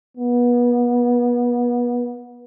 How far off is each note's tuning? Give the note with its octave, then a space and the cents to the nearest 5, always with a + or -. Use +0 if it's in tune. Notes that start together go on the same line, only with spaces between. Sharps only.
B3 -30